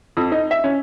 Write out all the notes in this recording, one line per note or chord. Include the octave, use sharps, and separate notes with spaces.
F2
D#4
E5
C#4